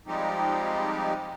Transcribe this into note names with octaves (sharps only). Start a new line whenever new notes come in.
F3 G3 G#3 C4 D#4 G4